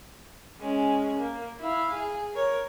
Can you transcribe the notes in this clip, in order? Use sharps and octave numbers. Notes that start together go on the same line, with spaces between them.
G#3 C#4
A#3
E4 F5
G#4
A#4 C#5